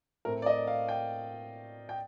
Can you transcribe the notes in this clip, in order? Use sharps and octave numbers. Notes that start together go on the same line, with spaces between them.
A2 A3 C4 A#4
D5
D#5
F5
G5
G5